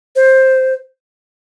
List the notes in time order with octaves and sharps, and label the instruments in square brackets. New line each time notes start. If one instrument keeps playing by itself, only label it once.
[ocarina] C5